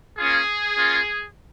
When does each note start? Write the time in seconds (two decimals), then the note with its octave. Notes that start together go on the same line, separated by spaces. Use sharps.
0.18 A#3 C#4 F4 G#4
0.77 A#3 C#4 F4